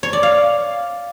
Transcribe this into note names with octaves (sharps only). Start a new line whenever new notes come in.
C#5
D5
F5